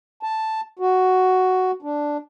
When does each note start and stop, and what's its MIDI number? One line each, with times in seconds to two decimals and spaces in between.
0.23 0.61 81
0.79 1.71 66
1.82 2.17 62